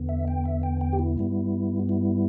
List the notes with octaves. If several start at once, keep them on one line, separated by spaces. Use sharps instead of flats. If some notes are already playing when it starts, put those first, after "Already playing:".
Already playing: E2 D3 B3
E5
G5
E5
G5
G5
G4
E4
G2 G3 B3
E4